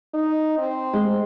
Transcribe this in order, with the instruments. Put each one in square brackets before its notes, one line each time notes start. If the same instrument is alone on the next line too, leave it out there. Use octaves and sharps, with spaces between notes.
[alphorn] D#4
C4
[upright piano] G#3